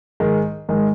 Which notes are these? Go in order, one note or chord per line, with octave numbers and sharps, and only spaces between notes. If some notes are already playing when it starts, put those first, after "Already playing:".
G#2 D#3 G#3
G#2 D#3 G#3